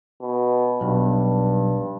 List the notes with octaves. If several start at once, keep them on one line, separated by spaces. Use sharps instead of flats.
B2
B1 G2